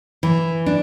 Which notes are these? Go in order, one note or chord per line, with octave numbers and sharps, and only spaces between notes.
E3
D4